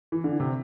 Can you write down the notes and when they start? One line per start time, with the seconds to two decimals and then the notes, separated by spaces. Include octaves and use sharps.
0.12 E3
0.24 D3
0.40 C3